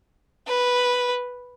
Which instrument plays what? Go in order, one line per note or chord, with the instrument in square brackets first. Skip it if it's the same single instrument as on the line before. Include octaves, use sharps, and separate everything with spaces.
[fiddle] B4